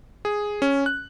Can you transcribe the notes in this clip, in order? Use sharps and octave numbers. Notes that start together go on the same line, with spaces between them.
G#4
C#4
F#6